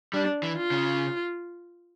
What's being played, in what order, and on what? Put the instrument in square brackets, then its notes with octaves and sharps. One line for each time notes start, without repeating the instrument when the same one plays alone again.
[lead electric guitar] G3 [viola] D4
[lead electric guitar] E3
[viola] F4
[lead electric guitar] C#3